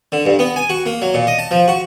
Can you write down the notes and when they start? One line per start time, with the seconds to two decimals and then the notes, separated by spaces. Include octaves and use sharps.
0.12 D3
0.25 G2
0.39 B3
0.56 G#5
0.69 F#4
0.86 A#3
1.02 F#3
1.14 A#2
1.27 D#5
1.39 A5
1.51 F3
1.68 F#4